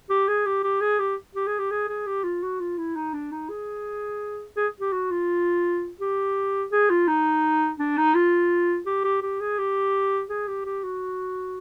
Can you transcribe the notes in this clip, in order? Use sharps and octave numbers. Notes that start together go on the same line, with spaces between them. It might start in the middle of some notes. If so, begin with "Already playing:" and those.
G4
G#4
G4
G4
G#4
G4
G4
G#4
G4
G#4
G#4
G4
F4
F#4
F4
E4
D#4
D4
D#4
G#4
G#4
G4
F#4
F4
G4
G#4
F4
D#4
D4
D#4
F4
G4
G4
G4
G#4
G4
G#4
G4
G4
F#4